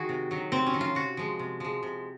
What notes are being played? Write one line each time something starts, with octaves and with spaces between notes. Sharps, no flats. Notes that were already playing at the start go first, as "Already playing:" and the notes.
Already playing: D#3 F#4 G#4
C3
D#3 F#3
C3 C4
C#4
D#3 F#3
F4
C3 F#4
F3 G#3
C3
F3 G#3
C3